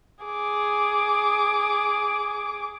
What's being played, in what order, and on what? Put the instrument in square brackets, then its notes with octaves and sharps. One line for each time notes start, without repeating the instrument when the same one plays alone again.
[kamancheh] G#4 D6